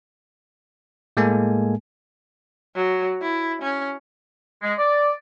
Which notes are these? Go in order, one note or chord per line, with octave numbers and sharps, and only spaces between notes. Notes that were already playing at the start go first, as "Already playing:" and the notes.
A2 G#3 A#3 A4 G#5
F#3
E4
C#4
G#3
D5